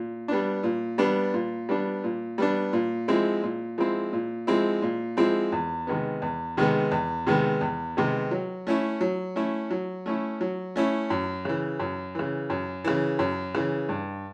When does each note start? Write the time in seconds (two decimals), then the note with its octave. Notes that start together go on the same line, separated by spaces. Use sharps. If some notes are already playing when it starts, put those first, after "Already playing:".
Already playing: A#2
0.28 G3 B3 D4
0.63 A#2
0.98 G3 B3 D4
1.34 A#2
1.69 G3 B3 D4
2.04 A#2
2.38 G3 B3 D4
2.73 A#2
3.08 F3 G#3 C4 E4
3.43 A#2
3.78 F3 G#3 C4 E4
4.13 A#2
4.47 F3 G#3 C4 E4
4.82 A#2
5.17 F3 G#3 C4 E4
5.52 E2
5.87 C3 D#3 G#3 B3
6.22 E2
6.57 C3 D#3 G#3 B3
6.92 E2
7.27 C3 D#3 G#3 B3
7.61 E2
7.97 C3 D#3 G#3 B3
8.31 F#3
8.67 A3 C#4 E4
9.01 F#3
9.36 A3 C#4 E4
9.71 F#3
10.06 A3 C#4 E4
10.41 F#3
10.76 A3 C#4 E4
11.10 F#2
11.45 C#3 E3
11.80 F#2
12.15 C#3 E3
12.50 F#2
12.84 C#3 E3
13.19 F#2
13.55 C#3 E3
13.89 G2